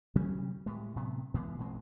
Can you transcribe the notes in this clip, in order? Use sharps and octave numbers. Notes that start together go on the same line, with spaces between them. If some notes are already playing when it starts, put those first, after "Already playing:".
C3 F#3 G3 C#4
A2 G3 G#3
A2 C3 F#3 B3
A#2 E3 G#3 B3
A1 A#2 G#3 C4